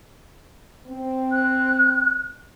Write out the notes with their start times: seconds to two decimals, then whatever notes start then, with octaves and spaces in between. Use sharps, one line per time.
0.87 C4
1.32 F#6